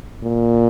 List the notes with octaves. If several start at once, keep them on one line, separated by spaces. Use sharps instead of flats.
A#2